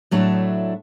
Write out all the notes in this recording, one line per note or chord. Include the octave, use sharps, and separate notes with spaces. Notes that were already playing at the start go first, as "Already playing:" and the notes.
A2 F#3 A3 D4 E4